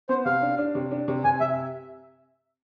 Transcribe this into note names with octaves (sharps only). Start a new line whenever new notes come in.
B3 C5
C3 F5
D4
D4
C3
D4
C3
C3 G#5
C3 E5